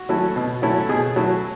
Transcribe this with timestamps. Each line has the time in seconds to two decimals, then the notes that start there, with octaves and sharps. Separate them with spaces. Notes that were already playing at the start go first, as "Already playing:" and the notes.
Already playing: F#4
0.09 F#3 A3 C#4 E4
0.36 B2
0.62 F#3 A3 C#4 E4
0.89 B2 G#4
1.16 F#3 A3 C#4 E4